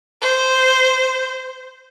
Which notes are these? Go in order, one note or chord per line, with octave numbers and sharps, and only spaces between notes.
C5